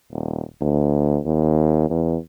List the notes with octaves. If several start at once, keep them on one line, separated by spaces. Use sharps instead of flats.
D#1
D2
D#2
E2